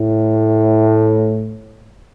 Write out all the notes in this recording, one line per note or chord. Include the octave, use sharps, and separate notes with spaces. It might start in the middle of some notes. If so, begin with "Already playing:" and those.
Already playing: A2